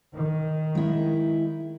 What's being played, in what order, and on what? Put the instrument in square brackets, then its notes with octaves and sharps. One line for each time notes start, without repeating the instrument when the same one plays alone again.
[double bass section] D#3
[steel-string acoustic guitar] G#3 E4